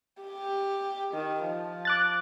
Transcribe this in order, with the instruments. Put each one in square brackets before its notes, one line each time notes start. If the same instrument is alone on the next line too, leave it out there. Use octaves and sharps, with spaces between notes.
[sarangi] G4
D#3
F3
[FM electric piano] D6 F#6 A6